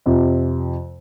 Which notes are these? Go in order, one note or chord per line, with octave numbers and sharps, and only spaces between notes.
F2 C3 F3